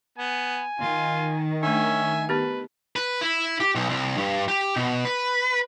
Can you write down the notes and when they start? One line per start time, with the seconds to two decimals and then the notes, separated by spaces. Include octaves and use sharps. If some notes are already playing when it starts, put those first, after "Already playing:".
0.18 B3 G#5
0.79 D#3 F4
1.63 A3 C#4 D4 E5 G#5
2.29 B3 G4 B4
2.96 B4
3.21 E4
3.60 G4
3.75 B1
3.89 C2
4.17 G2
4.48 G4
4.76 B2
5.05 B4